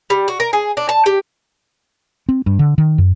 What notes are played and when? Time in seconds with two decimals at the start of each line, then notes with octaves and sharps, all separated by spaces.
0.10 G3
0.28 F#4
0.40 A#4
0.53 G#4
0.77 D4
0.89 A5
1.06 G4
2.29 C4
2.46 G2
2.59 D3
2.78 D#3
2.98 F#2